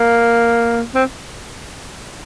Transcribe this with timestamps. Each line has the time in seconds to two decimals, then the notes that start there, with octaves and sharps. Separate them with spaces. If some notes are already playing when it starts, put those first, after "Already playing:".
Already playing: A#3
0.94 C4